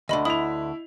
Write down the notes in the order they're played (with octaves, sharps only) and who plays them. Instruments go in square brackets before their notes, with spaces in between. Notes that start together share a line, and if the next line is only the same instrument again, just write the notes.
[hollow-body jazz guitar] D2 D3 [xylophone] D#5 B5
[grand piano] E4 F7 [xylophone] B5 D#6